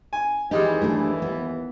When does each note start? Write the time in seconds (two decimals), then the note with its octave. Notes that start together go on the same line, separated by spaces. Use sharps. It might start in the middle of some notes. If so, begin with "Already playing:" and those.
0.13 G#5
0.51 D#2 E3 G3 G#3 D#4 G4
0.82 A3 D4
1.22 B3